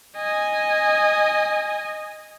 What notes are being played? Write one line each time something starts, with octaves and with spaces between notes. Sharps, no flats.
D#5 G#5